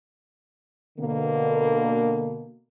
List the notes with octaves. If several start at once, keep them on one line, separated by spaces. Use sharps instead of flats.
B2 D3 A#3